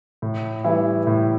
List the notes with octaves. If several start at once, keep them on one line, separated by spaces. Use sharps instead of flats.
A2
E3 G3 E4
A2